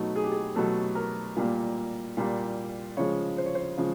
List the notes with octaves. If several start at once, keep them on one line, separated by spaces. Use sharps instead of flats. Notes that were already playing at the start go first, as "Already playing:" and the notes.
Already playing: B2 F#3 A3 D#4
G#4
G4
G#4
B2 F#3 A3 A4
A#4
A#2 G3 A#3
A#2 G3 A#3
C#3 F3 G#3 C#5
C5
C#5
C5
C#3 F3 G#3